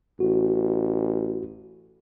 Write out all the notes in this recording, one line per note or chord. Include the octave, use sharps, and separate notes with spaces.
A1 F#4